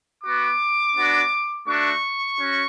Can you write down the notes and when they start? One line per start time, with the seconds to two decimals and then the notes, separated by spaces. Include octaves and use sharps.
0.24 B3 F#4 D6
0.96 B3 D4 F#4
1.66 A3 D4 F#4 C#6
2.38 C#4 F#4